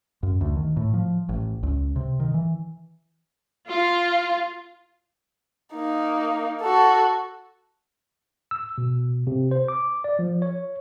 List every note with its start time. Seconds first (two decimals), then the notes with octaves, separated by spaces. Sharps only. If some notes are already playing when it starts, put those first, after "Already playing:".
0.23 F#2
0.41 D2
0.56 D#3
0.77 A2
0.94 F3
1.29 A1
1.63 C#2
1.96 C3
2.20 D#3
2.34 E3
3.71 F4
5.74 A#3 D#4
6.61 F#4 A4
8.51 E6
8.78 B2
9.27 C3
9.51 C5
9.68 D6
10.04 D5
10.19 F3
10.42 C#5